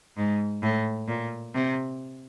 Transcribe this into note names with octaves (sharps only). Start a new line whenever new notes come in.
G#2
A2
A#2
C3